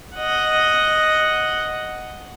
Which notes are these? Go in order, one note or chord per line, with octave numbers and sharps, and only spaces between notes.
D#5 F#5